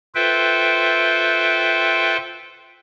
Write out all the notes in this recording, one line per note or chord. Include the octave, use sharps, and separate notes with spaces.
F4 A4 B4 C5 E5 G5